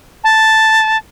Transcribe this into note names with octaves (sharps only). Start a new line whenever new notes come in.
A5